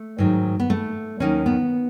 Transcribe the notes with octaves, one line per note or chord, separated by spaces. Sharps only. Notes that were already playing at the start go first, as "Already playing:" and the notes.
Already playing: A3
G#2 D#3 F#3
B3
A3
D#2 D#3 F#3 C#4
B3